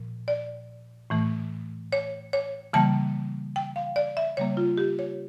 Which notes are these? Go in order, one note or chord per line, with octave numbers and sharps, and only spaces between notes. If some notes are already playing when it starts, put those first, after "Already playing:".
Already playing: A#2 F3
D5
A2 E3 A3
C#5
C#5
C#3 E3 G3 A#3 A5
G5
F5
D5
E5
C#3 G3 A#3 C#5
F4
G4
C#5